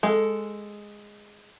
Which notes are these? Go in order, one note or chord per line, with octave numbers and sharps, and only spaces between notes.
G#3 A4